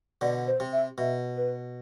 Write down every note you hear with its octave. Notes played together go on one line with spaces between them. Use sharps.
B2 D3 D5
C5
C3
E5
B2 E5
B4